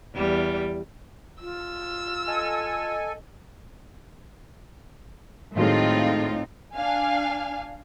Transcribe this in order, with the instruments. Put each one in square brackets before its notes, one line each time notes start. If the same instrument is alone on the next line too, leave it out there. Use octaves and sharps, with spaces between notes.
[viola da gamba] E2 G3
[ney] F4 [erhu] E6
[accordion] A4 G#5 [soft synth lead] D#5
[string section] A2 F4 [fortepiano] D#3 F#3 G#3 [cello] C4 D#4
[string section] D4 F5 G#5